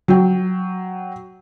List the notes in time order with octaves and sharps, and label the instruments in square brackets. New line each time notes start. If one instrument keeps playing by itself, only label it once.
[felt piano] F#3 G5